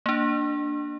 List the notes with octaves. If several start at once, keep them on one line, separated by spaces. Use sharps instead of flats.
A#3 D4